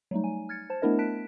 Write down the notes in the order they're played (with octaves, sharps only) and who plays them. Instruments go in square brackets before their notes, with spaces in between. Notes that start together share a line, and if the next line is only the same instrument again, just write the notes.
[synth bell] F#3 G3 A3 D#4
G#5
F6 G#6 A6 C#7
C5 A5
A3 B3 D4 E4 A#4 D#5
A5 F#6 B6 D7